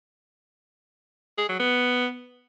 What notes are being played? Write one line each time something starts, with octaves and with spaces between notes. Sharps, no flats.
G#4
F#3
B3